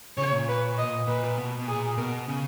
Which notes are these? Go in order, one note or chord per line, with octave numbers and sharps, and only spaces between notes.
C#3 C#5
A#2
B4
D#5
A#2 B4
B2
B2
A#2 G#4
B2 A#4
C#3